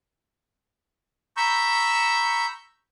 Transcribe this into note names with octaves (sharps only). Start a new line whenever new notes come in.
A#5 B5 C#6 E6 G6